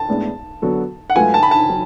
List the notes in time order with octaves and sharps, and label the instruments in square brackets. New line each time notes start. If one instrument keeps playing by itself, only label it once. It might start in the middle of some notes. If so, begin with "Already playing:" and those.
Already playing: [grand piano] A5
[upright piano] A2 G#3 B3 D4
D3 F#3 B3 F#4 A4
[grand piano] F#5
[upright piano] G#2 F#3 A3 F4 B4 [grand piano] G#5
[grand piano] A5
B5
A5
[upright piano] F#3